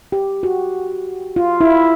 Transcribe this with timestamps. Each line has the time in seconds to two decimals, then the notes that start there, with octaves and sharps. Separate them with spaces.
0.12 G4
0.43 F#4
1.36 F4
1.61 E4